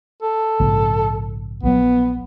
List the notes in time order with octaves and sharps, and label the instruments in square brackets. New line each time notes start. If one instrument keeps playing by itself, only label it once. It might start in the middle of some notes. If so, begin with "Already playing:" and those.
[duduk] A4
[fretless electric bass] A#1 G#2 C#3
[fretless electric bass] A#1 F#3 [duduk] B3